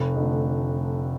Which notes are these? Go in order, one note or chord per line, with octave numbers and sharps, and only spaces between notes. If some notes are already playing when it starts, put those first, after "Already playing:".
Already playing: F1
F2 D3 A3